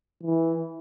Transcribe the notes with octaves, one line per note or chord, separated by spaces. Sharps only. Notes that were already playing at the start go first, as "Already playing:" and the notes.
E3